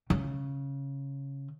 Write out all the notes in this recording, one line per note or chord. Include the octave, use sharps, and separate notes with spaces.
C#3